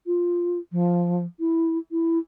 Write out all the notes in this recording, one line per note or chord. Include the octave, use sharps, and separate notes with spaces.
F4
F3
E4
E4